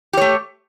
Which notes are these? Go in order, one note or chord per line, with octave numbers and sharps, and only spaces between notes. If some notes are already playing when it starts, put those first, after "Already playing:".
A3 G4 C#5